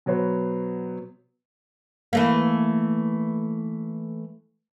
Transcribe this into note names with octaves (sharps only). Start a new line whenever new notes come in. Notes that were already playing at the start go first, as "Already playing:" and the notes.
B2 F#3 B3 C5
E3 A3 A#3